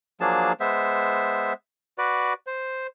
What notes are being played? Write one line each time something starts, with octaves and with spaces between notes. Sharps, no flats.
F3 F#3 A#3 D4 G#4 A5
G#3 B3 C5 E5
F#4 B4 D5
C5